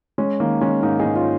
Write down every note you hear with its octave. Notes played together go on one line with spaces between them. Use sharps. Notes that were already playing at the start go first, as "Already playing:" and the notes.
G#3 C#4
D#3 A#3
G#3 C#4
G#2 A#3 D#4
D#4 G#4
G#2
C#4 F4